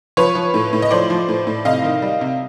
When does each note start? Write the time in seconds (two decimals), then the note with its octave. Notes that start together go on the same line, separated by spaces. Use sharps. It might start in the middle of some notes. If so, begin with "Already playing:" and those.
0.17 F3 B4 C#5
0.35 F3
0.54 A2
0.73 A2
0.82 D#5
0.91 F3 C5 D5
1.10 F3
1.28 A2
1.47 A2
1.65 C3 D#5 F5
1.84 D#3
2.02 G3
2.21 C3